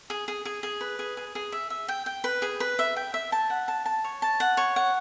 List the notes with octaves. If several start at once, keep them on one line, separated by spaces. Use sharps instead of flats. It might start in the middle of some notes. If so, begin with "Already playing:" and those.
G#4
G#4
G#4
G#4
B4
G#4
G#4
G#4
E5
E5
G5
G5
B4
G#4
B4
E5
G5
E5
A5
F#5
A5
A5
C#5
A5
F#5
C#5
F#5